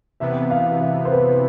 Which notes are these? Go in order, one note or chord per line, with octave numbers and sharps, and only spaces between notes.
C3 E3 B3 E5
F5
E5
C5
B4